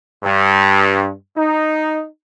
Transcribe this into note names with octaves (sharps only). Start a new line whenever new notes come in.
G2
D#4